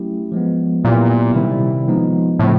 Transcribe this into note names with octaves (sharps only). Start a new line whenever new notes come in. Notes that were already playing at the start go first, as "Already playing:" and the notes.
Already playing: F#3 A3 C#4 E4 G4
F3 G#3 B3
A#2 F#3 B3 E4 G4
C3 D#3 G3 C4 E4
F3 G#3 B3 D#4
A2 C#3 F3 A3 C4